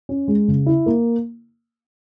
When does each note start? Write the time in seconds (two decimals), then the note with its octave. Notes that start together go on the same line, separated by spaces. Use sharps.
0.09 C#4
0.28 G#3
0.48 C#3
0.66 E4
0.86 A#3